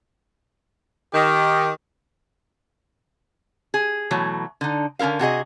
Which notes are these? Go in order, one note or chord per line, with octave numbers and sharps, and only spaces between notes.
D#3 G4
G#4
B2 E3 F#3 A3
D3 D#4
D3 C#4 E4 A#4 F5
C3 F#4 G#4 D#5